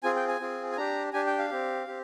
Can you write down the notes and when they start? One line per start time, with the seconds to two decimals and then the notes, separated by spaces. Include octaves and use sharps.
0.03 C4 F4 G#4 G#5
0.16 G5
0.28 G#5
0.40 C4 F4 G#4
0.72 G#5
0.77 D4 G4 A#5
1.13 D4 G4 G#5
1.27 G5
1.39 F5
1.50 C4 G4
1.87 C4 G4